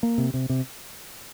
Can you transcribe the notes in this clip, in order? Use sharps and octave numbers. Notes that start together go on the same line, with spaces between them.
A#3
C3
C3
C3